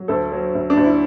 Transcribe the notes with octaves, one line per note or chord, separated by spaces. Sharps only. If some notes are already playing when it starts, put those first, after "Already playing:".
Already playing: F#3
D2 A4
F#3
D2
D4
D2
E4